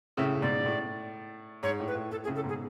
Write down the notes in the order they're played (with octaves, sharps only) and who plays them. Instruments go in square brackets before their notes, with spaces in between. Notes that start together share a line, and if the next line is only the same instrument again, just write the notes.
[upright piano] A2 C#3 [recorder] E5
[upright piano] A2
[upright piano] G#2 B2 [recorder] D5
[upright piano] B2
A2
[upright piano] G#2 [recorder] C#5
[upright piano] A2
[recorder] B4
[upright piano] A2
[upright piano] A2 [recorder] A4
[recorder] G#4
[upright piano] A2 C#3
[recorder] A4
[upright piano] G#2 B2 [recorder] G#4